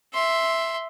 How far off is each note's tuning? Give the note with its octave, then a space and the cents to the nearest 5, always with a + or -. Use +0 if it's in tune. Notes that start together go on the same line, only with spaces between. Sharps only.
E5 +0 C6 +0